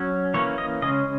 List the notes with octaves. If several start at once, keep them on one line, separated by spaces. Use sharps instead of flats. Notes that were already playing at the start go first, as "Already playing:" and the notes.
Already playing: F#3 C#4
E3 A#3 C#4 C#5
D#5
C#3 G#3 C#4 D#5